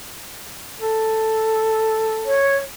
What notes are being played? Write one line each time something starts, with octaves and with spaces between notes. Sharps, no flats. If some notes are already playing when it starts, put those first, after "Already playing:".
A4
C#5